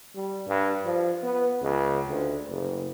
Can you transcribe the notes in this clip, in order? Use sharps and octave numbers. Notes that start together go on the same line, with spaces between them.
G3
G2
F3
B3
C#2
D2
F#1